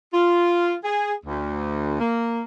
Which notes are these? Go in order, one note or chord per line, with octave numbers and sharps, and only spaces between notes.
F4
G#4
D2
A#3